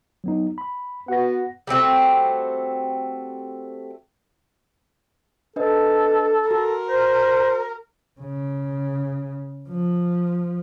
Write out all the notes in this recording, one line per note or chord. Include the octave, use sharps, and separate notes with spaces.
F#3 B3 D#4
B5
B3 F#4 F#5 A#6
G3 A3 C4 F#4
D4 A4 B4 D#5
F#4 A#4
C5
C#3
F3